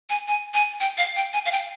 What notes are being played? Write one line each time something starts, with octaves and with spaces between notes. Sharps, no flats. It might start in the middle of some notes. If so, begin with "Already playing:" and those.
G#5
G#5
G#5
G5
F5
G5
G#5
F5
G5